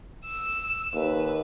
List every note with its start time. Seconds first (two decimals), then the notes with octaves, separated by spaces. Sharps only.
0.25 E6
0.94 D#2 B4